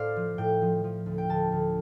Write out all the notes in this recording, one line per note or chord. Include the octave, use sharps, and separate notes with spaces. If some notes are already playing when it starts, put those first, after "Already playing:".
Already playing: A2 C5 D5 F5
F3
A2 G5
F3
F3
D2
G5
D2 A5
D2